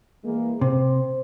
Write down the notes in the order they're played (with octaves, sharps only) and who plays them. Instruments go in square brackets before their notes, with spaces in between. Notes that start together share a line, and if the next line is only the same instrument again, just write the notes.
[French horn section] E3 G#3 A#3
[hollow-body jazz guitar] C3 [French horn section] C5